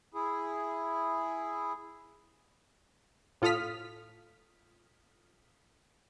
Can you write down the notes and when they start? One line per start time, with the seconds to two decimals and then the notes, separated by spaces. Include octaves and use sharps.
0.14 E4 G#4
3.42 A2 F4 A4 D#6 F6 B6